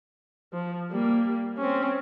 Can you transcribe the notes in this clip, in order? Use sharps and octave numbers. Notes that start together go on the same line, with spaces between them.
F3
G3 A#3
C4 C#4